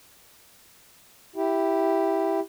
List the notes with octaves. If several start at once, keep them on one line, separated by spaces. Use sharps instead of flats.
E4 G4